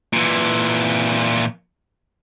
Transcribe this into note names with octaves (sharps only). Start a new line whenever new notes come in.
A#2 E3